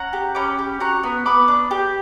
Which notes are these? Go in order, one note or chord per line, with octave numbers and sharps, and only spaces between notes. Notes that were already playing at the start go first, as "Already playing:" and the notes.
Already playing: C#4 F#5 A#5
G4
C#4 B5 D6
G4
F#4 A#5 C#6
B3
B3 B5 D6
D4
G4